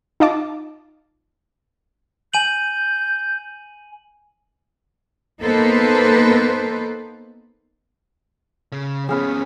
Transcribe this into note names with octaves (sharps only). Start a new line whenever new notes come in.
D#4 F4 D#5 F5 A5 D6
G#5 G6 D#7 F#7
A#3 B3 D#4 A4 B4 C5
C#3
F3 B3 C#4 G#4 F5 B5